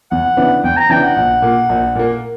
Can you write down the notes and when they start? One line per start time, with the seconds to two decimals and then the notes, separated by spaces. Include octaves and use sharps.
0.11 E2 F#5
0.37 C#3 E3 B3 D4
0.64 E2 G5
0.77 A#5
0.90 C#3 E3 B3 D4 G5
1.03 F#5
1.16 A#1
1.42 A#2 A#3
1.69 A#1
1.95 A#2 A#3